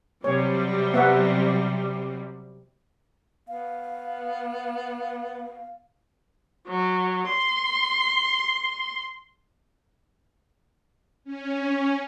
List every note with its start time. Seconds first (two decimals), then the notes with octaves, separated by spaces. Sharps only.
0.24 C3 F#3 G3 C#5
0.94 B3 E5 F#5
3.48 B3 F5
6.67 F#3
7.27 C6
11.24 C#4